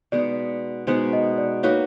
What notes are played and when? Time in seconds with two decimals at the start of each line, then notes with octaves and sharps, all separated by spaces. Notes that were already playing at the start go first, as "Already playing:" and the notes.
0.12 B2 G#3 B3 D#4 D5
0.87 B2 G#3 B3 D#4 C5
1.13 D#5
1.38 D5
1.63 A#3 D#4 F#4 B4 C#5